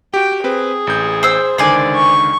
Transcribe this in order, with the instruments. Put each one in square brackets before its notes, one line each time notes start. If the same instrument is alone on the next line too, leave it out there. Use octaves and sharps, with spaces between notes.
[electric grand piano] F#4 G4 [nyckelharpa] G5
[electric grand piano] C4 B4 [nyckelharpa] G#4
[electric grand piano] A1 G6
[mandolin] C5 E6
[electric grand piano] C#2 D3 D#3 [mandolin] C5 D5 G#5
[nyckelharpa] C#6